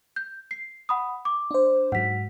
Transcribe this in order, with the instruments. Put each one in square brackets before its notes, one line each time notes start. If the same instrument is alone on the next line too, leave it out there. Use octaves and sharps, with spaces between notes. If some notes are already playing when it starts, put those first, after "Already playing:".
[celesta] G6
C7
F#5 B5 D#6
D6
[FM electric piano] D4 C5
[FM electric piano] G#2 F#3 [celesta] F#5 B6